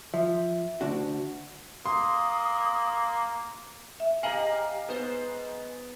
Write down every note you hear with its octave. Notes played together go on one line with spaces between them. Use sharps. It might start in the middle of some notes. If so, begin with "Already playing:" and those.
F3 E5
D2 D4 F#4
A#3 C6 D#6
E5
G4 A4 D#5 F5 G#5 A#5 A#6 F#7
G#2 B3 C5